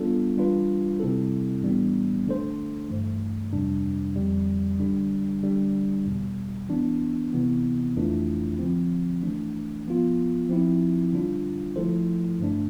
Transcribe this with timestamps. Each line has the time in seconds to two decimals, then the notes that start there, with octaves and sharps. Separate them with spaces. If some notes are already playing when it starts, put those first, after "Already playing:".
Already playing: G3 B3 D4 F4 A4
0.37 E3 G3 D4 F4 B4
1.00 C3 G3 C4 E4 A4
1.63 A2 E3 G3 B3 D4
2.26 D3 A3 D4 A4 C5
2.90 G2 E3 A3
3.53 F2 C3 G3 D4
4.16 F2 D3 G3
4.80 D3 G3 D4
5.43 D3 G3 D4
6.06 E2 B2 G3
6.69 E3 B3 D4
7.33 C3 E3 B3
7.96 F2 E3 A3 D4 F4
8.59 D3 F3 C4
9.23 E3 A3 D4
9.86 F3 B3 F4
10.49 F3 C4 E4
11.13 D3 G3 D4 F4
11.76 F3 A3 E4 A4 C5
12.39 G2 D3 A3 D4